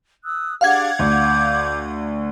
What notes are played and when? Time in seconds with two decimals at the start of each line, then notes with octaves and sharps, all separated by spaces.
0.24 D#6 E6 F#6
0.61 D4 G4 G#4 F5 F#5 G#6
0.99 D2 D6 G6